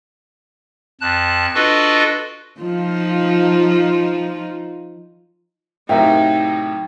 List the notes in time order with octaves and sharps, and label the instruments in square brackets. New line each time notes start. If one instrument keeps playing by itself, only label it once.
[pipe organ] F2 A5 F#6
D4 F4 F#4 A4 B4 D#5
[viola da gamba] F3 D#4 F4
[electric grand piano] A2 C3 F#3 [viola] D#4 [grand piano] A#4 E5 F5 [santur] G5